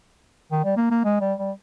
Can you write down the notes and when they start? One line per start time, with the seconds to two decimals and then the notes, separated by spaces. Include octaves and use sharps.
0.51 D#3
0.65 G3
0.77 A#3
0.91 A#3
1.04 G#3
1.21 G3
1.39 G3